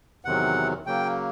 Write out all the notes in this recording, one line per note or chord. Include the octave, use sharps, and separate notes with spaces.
E2 C3 D#3 F#3 F#5
C#3 F#3 A#3 G5